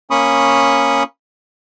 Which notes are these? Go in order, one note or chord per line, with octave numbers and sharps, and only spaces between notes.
A#3 C#4 B5 C#6 D#6